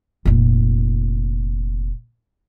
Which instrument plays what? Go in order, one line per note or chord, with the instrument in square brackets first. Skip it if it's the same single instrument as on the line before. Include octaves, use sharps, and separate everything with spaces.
[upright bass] F1 A#2